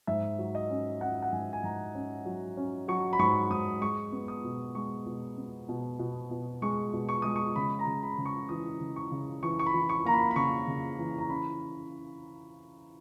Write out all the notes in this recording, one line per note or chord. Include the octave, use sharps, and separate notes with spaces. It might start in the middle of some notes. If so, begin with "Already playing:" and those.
G#2 E5
F#3
D#5
C#4
C#4 F#5
F#5
G#2 G#5
G#5
G#2 A#5
C#4
F#3
C#4
F#3 C#6
B5
G#2 C#6
G#2 D#6
G#3 C#6
B3
D#6
B2
G#3 C#6
B2
B3
B2
B2
B2
G#3 C#6
B2
C#6
G#3 D#6
C#6
C#3 B5
A#5
C#3
B5
C#3
C#6
E3 D#6
C#3
C#6
C#3
E3 C#6
C#6
B5
E3
C#6
A#3 A#5
B5
B5
C#3 C#6
C#3
E3
A#5
C#4 B5